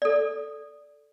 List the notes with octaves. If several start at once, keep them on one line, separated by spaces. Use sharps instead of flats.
A4 D5